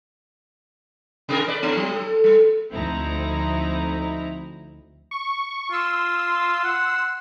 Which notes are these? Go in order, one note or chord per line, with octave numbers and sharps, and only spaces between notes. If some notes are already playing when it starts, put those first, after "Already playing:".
C3 G#4 A#4
A3 B4 D5
A2 D3 B3
F#3
A4
G3
D2 F3 C4 D#4 E4 A#5
C#6
F4 C6 E6
F#5